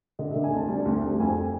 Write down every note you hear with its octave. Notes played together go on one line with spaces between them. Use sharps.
D3 D#5
E5
D3
G#5
D2 A5
G3
D2
D2
F2 G#5